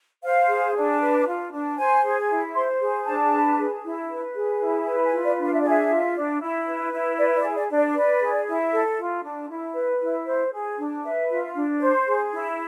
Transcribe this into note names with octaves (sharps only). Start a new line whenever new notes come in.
C5 F5
G#4
D4
B4
F4
D4
C5 G#5
G#4
E4
C5 C6
G#4
D4 A5
B4
G#4
E4
B4
G#4
E4
B4 G#5
G#5
F4
D5
D4
F5
E5
G#4 D5
E5
F4
D4
E4
B4
E4
B4 D5
D5
G#4
D5
D4
D5
B4 D5
G#4
E4
A4
F4
D4
E4
B4
E4
C5
G#4
D4
B4 E5
F4
D4
C5
G#4
E4